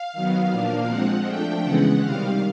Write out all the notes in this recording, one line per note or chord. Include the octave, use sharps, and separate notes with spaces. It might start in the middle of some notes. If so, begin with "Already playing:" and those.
Already playing: F5
D#3 F#3 B3
A#2 F3 A#3 D4
F3 G#3 C4 F#5
F3 A3 D4 G5
C#3 E3 G#3 B3 F#5
C3 D#3 G3 F5